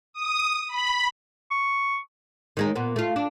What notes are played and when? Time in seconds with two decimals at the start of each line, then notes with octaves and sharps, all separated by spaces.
0.13 D#6
0.68 B5
1.51 C#6
2.57 D#3 G#3 D#4
2.76 A#2 B3
2.96 A3 F4
3.16 D4